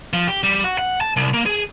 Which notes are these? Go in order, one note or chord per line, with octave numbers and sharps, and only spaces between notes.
F3
G4
G3
F#4
F#5
A5
C2
A#3
G#4